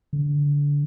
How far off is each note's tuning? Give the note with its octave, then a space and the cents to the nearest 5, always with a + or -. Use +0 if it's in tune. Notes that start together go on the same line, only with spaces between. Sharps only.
D3 -25